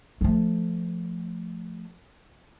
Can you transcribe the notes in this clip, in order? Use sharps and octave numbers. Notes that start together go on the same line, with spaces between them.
F3 A3